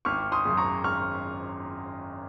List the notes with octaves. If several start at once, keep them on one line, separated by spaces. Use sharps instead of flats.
G#1 C#6 F6
C6 D#6
F#2 C#3
A#5 C#6
G#1 C#6 F6